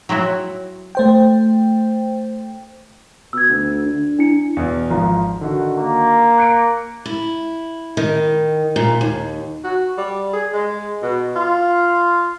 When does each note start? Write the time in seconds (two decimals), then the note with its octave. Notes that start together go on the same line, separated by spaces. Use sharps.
0.09 F#3 C4 E4 F#4
0.95 A3 C5 G5
3.33 B2 E6 G#6
3.49 D2
3.85 D3
4.19 D4 E4 C#7
4.57 E2 B2
4.90 G#1 F3 A#5
5.41 D3 D#3 F#4
5.77 A#3
6.38 F#6 C#7 D7
7.06 E4
7.97 D#3
8.76 A#2
9.01 D#2
9.64 F#4
9.98 G3
10.33 G#4
10.53 G#3
11.02 B2
11.36 F4